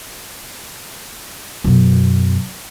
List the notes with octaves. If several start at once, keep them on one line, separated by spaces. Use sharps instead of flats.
F#2 B2